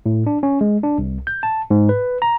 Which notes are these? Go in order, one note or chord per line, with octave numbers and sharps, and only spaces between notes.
A2
D4
C#4
G#3
D4
C2
G6
A5
G#2
B4
A#5